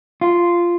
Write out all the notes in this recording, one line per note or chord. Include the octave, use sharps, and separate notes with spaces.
F4